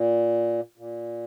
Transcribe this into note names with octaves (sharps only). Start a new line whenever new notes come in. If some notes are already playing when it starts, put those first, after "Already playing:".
Already playing: A#2
A#2